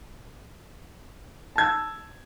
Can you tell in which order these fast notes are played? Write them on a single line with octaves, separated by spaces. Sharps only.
A5 G#6 E6